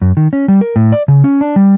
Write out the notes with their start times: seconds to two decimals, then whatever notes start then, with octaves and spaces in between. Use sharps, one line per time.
0.02 F#2
0.17 D#3
0.33 C#4
0.48 G3
0.61 A#4
0.76 A2
0.92 D5
1.08 C#3
1.24 C#4
1.41 D4
1.56 G3